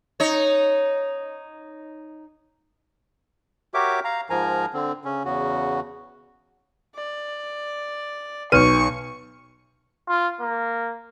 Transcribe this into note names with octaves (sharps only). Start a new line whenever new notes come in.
D#4 C#5
F#4 G4 A#4 C#5 E5 D6
F5 A#5
G#2 F3 A#4 G#5 A#5
D3 C4
C#3 C#4
E2 C#3 F#4
D5
B1 B4 C#6 D#7
F4
A#3